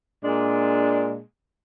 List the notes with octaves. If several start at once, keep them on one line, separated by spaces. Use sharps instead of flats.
A#2 G#3 D4